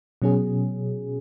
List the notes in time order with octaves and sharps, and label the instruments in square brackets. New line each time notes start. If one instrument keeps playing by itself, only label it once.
[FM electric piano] B2 F#3 C#4 G#4